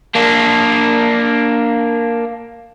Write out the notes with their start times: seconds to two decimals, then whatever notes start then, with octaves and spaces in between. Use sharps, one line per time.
0.15 A#3 D4